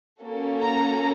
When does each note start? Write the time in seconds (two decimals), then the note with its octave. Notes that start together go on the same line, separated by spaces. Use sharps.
0.20 A#3 C#4 F#4 A4
0.63 A#5